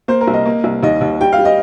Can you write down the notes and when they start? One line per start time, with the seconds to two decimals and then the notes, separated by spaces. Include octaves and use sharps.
0.08 A#3 C5
0.21 A#4
0.27 C2
0.34 D#5
0.46 A#3
0.64 C2
0.83 D#2 D#5
1.01 D#2
1.20 G3 G5
1.32 F5
1.39 G3
1.45 D#5